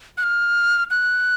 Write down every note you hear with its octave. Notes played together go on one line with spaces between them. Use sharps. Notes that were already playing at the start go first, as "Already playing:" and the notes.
F#6
F6
F#6